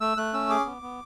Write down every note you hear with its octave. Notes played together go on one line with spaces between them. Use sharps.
A3 E6
A3 F#6
C#4 E6
G#4 D6
B3
B3